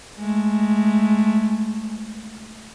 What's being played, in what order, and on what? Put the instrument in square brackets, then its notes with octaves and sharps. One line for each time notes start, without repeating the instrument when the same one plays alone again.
[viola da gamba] G#3 A3